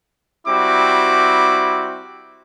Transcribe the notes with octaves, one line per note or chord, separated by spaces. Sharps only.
G3 C4 E4 F#4 D6